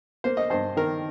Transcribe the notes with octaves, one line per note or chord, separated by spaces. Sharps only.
A#3 C5
D#5
G2 C5
D#3 A#4